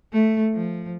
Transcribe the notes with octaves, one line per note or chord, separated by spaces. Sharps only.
A3
F3